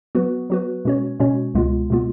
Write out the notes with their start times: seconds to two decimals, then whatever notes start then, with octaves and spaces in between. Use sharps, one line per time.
0.15 F#3 B3 F#4 B4
0.50 F#3 B3 F#4 B4
0.85 B2 G#3 C#4 F#4 C#5
1.20 B2 G#3 C#4 F#4 C#5
1.54 C#2 B2 G#3 B3 F4
1.90 B2 G#3 B3 F4